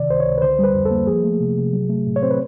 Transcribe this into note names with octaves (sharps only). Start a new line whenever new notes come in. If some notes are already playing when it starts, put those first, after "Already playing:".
Already playing: C3 D#3 D5
C#2 C5
C#5
C#2
B4
D3 C5
G3 B4
F2
A4
A#3
F3 G#4
A3
C3
C3
F#3
A3
A2
C#5
C4 C5
B4